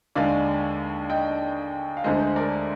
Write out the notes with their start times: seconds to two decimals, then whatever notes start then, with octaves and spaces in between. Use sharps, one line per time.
0.15 D#2 D3 G#3 D5 F5
1.09 D#5 G5
1.97 F5
2.04 D2 D3 G#3 C5 D#5
2.20 C5
2.36 A#4 D5